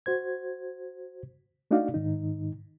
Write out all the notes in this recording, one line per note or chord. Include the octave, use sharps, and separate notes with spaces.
F#4 C5 G#6
A3 D4 D#4 F#4 D5 F5
G#2 D#3 D#4